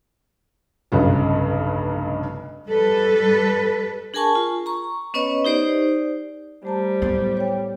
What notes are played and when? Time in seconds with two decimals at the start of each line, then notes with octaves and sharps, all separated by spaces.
0.92 F1 B1 G2 C#3 F#3
2.68 G3 A4 B4
4.14 D4 G#4 A#4 G#5 A5 C#6
4.35 F4
4.66 A#5 C#6
5.14 B3 C#4 B4 C#5 D#5
5.45 D#4 G4 C5 D5
6.65 G3 A3 C5 A5 A#5
7.02 A2 F#3 B3 E4
7.37 C#5 G5